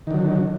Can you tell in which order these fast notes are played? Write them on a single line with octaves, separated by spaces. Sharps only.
D#3 D3 F#3